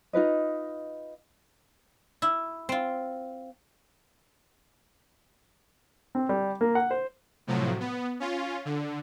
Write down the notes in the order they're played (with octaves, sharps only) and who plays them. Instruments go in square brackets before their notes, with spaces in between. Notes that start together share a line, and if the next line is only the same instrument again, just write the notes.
[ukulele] D#4 F4 B4 D#5
[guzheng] E4 [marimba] E6
[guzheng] C4 F4
[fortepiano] C4
G3
A#3
F#5
C5
[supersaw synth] A2 C3 F3 F#3
B3
C#4 F4
D3